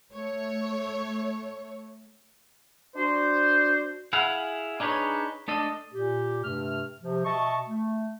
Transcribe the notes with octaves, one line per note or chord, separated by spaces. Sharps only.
A3 C#5
D4 F#4 C5
E4 G#4 F5 F#5
D4 D#4 G#4 B4 C#5
A3 D4 A4 D#5
A#2 G4
G2 C3 A3 F6
C3 F3
B2 D#5 E5 A5 C#6
A3